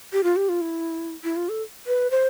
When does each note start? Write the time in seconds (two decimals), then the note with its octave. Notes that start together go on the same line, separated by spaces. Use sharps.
0.12 G4
0.24 F4
0.36 G4
0.49 F4
0.61 E4
1.24 E4
1.36 F4
1.49 A4
1.87 B4
2.11 C5